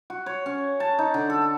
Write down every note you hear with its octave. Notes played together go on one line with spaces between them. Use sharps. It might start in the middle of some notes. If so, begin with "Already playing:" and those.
F#4
C#5
C#4
A5
D#4
D3
A4